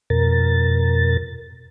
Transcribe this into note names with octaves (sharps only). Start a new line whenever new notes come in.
F2 B2 A#4 A6